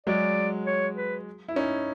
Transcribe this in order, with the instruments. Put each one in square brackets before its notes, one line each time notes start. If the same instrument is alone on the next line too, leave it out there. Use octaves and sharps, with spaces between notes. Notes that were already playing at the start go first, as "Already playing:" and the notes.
[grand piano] F#3 G#3 [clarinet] D5
[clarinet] C#5
B4
[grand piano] E4
C#4 D#4